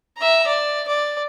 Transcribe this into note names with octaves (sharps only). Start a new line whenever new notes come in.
E5 A#5
D5
D5